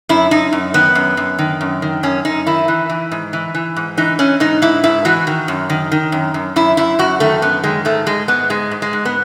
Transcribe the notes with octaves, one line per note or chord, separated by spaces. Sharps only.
F#2 E4
F#2 D#4
F#2
D#3 B3
F#2
F#2
D#3
F#2
D#3
F#2 C#4
F#2 D#4
D#3 E4
E3
E3
G#2
E3
E3
G#2
E3 D#4
E3 C#4
G#2 D#4
G#2 E4
G#2 E4
E3 F#4
D#3
F#2
D#3
D#3
F#2
F#2
F#2 E4
F#2 E4
F#2 F#4
D#3 A3
F#2 B3
D#3 G#3
G#2 A3
G#2 G#3
G#2 B3
G#2 G#3
G#2
G#3
G#2
B3